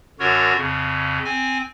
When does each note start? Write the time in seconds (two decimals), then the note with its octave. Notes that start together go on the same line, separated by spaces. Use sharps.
0.20 F#2 D3 F#4 A#4 C#5
0.57 F2 C#3
1.25 C4 G#5